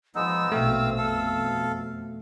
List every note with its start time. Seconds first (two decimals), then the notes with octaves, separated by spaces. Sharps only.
0.15 F3 G#3 B3 D#4 E6
0.52 A#1 B2 A3 C4 F5
0.98 F2 B2 A4 F5